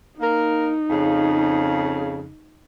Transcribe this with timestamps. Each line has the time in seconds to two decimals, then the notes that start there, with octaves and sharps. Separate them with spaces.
0.21 A#3 D#4 A#4
0.90 F2 C#3